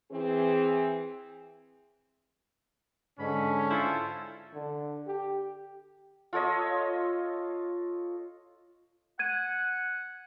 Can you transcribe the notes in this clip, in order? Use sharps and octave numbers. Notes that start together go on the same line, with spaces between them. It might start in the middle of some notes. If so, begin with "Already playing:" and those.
E3 C4 G#4
G#2 D3 C#4 B5
E4 F4 A4 C5
D3
G4
F4 A4 C#5 D#5
F#5 G#6 D#7